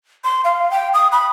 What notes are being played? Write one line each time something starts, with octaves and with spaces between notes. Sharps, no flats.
C6
F5
G5
D#6
B5